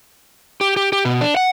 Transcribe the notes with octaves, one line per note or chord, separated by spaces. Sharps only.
G4
G4
G4
B2
D4
F#5